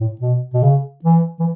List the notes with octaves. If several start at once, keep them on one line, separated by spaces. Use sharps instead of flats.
A2
B2
B2
C#3
E3
E3